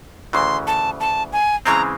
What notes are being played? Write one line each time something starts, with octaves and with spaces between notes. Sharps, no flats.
D2 C#3 E3 C6
A5
A5
G#5
C#3 E3 G#3 C4 A#5